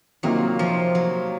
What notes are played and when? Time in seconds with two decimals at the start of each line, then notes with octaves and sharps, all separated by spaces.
0.23 C3 D#3 F#3 A#3 F4
0.59 F3
0.95 F#3